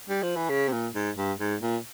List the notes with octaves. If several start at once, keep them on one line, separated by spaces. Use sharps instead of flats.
G3
F3
E3
C#3
C3
A#2
G#2
G2
G#2
A#2